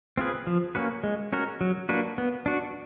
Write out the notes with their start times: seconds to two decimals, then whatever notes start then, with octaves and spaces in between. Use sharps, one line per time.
0.18 C4 F4 G#4 B4
0.47 F3
0.75 A#3 C#4 F#4 B4
1.04 G#3
1.33 C#4 F#4 A#4
1.61 F#3
1.89 A#3 D4 F#4 B4
2.18 B3
2.46 D4 F#4